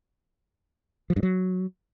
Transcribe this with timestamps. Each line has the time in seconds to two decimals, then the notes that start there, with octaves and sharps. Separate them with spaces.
1.10 F3
1.16 G2
1.23 F#3